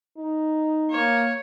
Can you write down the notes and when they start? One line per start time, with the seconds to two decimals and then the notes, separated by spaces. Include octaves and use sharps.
0.17 D#4
0.90 A#3 C#5